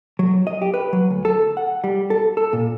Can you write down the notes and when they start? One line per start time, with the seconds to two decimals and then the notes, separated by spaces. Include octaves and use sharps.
0.19 F#3
0.47 D#5
0.62 G4
0.74 B4
0.93 F#3
1.10 D2
1.25 A4
1.57 F#5
1.84 G3
2.10 A4
2.37 A4
2.53 A#2